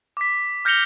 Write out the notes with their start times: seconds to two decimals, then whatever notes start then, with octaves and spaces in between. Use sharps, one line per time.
0.17 D6 B6
0.65 F6 G6 A#6 C#7 F7 G7